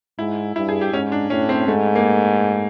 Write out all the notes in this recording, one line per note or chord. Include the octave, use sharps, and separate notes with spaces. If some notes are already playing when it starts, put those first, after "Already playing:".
G#2 E4
G2 E4
G#4
G4
G#2 C#4
D4
A2 C#4
C4
G#2 A3
A#3